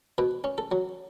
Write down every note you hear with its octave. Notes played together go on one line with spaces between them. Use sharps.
B2 B4
C#4
A4
F#3